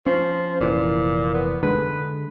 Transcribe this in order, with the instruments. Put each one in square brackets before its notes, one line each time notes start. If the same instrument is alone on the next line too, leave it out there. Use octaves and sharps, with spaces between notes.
[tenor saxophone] F3 [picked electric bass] C#4
[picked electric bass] F1 E3 [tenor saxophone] A#2
[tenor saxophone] B3
[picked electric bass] D3 G#3 [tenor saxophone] B4